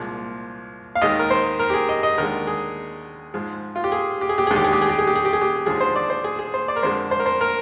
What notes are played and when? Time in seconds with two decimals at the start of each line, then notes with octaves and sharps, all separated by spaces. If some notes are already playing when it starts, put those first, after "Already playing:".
Already playing: C2 A#2 F3 G#3
0.95 F5
1.02 D#2 D#3 G#3 D#5
1.19 A#4
1.30 C5
1.59 A#4
1.70 G4
1.74 G#4
1.89 D#5
2.03 D#5
2.18 D#2 D3 G#3 A#4
2.47 G#4
3.34 G#2 F3 G#3
3.76 F4
3.84 G4
3.92 G#4
4.21 G4
4.29 G#4
4.38 G4
4.47 G#4
4.51 D#2 D3 G#3
4.56 G4
4.64 G#4
4.73 G4
4.82 G#4
4.89 G4
4.99 G#4
5.07 G4
5.15 G#4
5.25 G4
5.33 G#4
5.42 G4
5.66 D#2 D3 F3 G#3 G#4
5.81 C5
5.96 D5
6.10 C5
6.24 G#4
6.39 G#4
6.54 C5
6.68 D5
6.76 A#4
6.82 F2 D3 G#3 C5
7.11 C5
7.20 A#4
7.26 C5
7.41 A#4